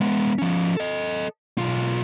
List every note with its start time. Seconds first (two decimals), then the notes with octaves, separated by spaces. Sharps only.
0.01 G#3 B3
0.38 F3 C#4
0.77 A4 D#5
1.58 B1 F4